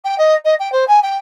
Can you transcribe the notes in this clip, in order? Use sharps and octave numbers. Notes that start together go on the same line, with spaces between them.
G5
D#5
D#5
G5
C5
G#5
G5